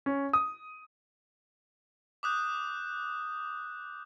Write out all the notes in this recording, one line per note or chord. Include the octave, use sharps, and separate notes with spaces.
C#4
D#6
D6 D#6 F#6 G6